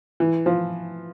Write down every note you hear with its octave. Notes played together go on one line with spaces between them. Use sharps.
E3
F3